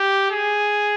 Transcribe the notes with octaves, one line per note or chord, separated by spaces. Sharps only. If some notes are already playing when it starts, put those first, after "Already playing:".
Already playing: G4
G#4